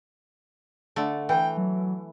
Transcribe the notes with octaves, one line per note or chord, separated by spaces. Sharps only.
D3 A3
E3 G5
F#3